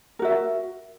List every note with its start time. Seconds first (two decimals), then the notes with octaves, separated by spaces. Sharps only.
0.19 A#4
0.22 F#4
0.25 E5